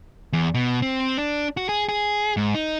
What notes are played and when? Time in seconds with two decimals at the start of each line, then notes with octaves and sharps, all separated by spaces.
0.33 E2
0.54 B2
0.82 C4
1.18 D4
1.57 F#4
1.69 G#4
1.89 G#4
2.37 G#2
2.55 D#4